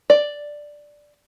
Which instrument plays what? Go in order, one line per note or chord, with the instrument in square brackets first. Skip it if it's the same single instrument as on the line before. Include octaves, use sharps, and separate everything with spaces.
[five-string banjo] D5